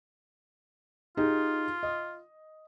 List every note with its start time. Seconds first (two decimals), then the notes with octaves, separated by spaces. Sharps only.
1.17 D#4 F4 G4 G#4
1.83 D#5